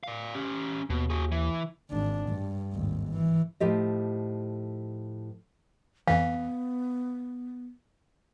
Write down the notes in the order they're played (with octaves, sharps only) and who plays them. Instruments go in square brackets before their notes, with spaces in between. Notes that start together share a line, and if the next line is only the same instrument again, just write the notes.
[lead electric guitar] D5 F5
C#4 G4
[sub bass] D#2 [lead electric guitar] B2
[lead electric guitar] F#4 G#4
E3
[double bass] G#1 D4
G2
G#1 D#2
E3
[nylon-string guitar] A2 F3 G4 D#5
[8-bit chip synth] F2 E3 [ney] B3 [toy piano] F5